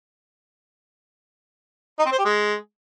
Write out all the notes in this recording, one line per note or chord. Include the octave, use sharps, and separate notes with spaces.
D#4
C4
C5
G4
G#3